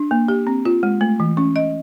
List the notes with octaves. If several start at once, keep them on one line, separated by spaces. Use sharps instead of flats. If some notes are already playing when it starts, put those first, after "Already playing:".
Already playing: D4
A#3
G4
C4
F4
G#3
A3
E3
C#4
D#5